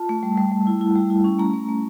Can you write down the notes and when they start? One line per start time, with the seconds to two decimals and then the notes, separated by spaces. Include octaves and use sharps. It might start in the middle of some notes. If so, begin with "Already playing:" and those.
Already playing: F4 A5
0.09 A3
0.23 G3
0.37 G3
0.52 G3
0.67 E4
0.81 E4
0.96 G3
1.10 E4
1.24 C#4
1.39 A3 A#5
1.54 A3
1.69 A3